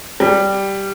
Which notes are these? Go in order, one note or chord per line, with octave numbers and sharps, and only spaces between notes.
G3